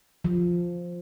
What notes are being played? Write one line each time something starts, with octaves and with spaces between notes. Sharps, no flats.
F3